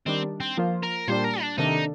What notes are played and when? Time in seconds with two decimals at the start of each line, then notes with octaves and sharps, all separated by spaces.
0.06 D#3 G3 C4 D4
0.40 C4
0.58 F3 A#3 F4 C5
0.83 A#4
1.08 A#2 G3 D4 C5
1.24 A#4
1.41 D4
1.58 C3 D#3 A#3 D4 D#4 A4